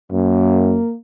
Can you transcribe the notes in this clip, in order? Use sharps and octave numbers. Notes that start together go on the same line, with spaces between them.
F#2 A#3